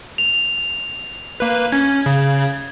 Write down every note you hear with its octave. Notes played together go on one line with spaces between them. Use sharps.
F7
A#3 B4
C#4 G#6
C#3